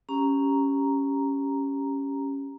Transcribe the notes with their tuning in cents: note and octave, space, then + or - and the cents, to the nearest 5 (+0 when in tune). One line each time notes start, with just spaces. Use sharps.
C#4 +0 G4 +0 A#5 +0